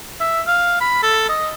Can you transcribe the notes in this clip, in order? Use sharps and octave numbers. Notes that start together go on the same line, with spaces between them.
E5
F5
B5
A4
D#5